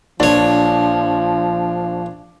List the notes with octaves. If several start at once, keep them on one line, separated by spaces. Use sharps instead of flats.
A#1 F3 D4 C#5